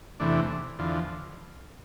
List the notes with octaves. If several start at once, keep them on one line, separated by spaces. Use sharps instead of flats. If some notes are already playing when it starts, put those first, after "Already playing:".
E2 C3 E3 A3 D4
E2 D3 F3